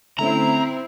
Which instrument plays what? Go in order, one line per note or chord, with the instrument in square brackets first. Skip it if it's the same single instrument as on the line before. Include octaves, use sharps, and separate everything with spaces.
[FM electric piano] D3 A3 C#4 [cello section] C4 E4 [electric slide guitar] A#5